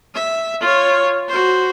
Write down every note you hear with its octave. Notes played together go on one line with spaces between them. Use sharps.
E5
F4 C#5
F#4 C5